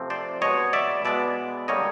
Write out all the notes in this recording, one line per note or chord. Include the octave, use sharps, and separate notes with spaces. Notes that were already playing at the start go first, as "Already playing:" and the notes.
Already playing: C3 F3 A3 C4
C5 D5
B2 G#3 B3 C#5 D#5
D5 E5
B2 G#3 B3 D5 E5
D3 G3 A#3 C#5 D#5